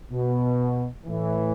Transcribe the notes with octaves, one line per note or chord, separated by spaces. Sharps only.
B2
A2 E3